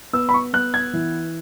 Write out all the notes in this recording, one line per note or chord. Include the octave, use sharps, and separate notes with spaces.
B3 E6
B5
C#6
B3 F#6
G#6
E3